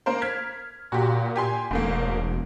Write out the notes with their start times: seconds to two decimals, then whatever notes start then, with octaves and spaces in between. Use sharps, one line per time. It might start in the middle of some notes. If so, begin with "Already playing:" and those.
0.06 A#3 A#4 C5
0.22 F6 G#6 B6
0.92 A#2 F#4 G4
1.36 G4 G#5 C6
1.71 E1 G#2 A3 A#3